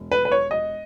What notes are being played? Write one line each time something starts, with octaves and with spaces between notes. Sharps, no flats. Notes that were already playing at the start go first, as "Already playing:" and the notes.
Already playing: E1
B4
B4
C#5
D#5